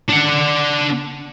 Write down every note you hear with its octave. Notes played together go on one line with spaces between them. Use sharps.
D4 F#5